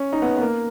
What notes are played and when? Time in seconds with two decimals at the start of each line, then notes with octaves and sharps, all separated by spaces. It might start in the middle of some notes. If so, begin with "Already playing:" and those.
Already playing: C#4
0.13 D#4
0.22 B3
0.37 B3
0.41 A#3